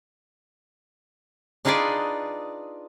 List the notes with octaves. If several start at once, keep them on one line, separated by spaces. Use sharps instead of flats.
D4 D#4 F4 G#4 B4 D5